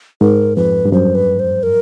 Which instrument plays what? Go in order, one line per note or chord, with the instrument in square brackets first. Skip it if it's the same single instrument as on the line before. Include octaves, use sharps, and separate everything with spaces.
[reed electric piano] G#2 [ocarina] A#4
[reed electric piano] F2 [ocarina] B4
[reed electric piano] G2
[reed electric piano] F#2 [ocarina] C5
[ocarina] B4
C5
A#4